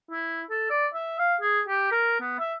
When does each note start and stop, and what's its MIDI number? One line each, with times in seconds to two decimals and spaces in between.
0.11 0.42 64
0.50 0.65 69
0.70 0.87 74
0.94 1.16 76
1.19 1.36 77
1.41 1.61 68
1.68 1.90 67
1.92 2.19 70
2.21 2.36 59
2.39 2.53 76